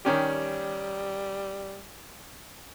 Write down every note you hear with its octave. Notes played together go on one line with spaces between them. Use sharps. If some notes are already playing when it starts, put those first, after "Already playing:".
D#3 G3 C#4 G4